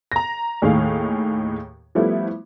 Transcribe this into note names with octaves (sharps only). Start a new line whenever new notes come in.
A#5 A#6
D#2 A2 D#3 G#4 F5
F3 G3 A3 B3 E4